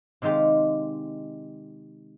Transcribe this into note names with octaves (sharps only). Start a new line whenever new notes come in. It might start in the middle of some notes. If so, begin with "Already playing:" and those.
C3 D#3 G#3 F4 G4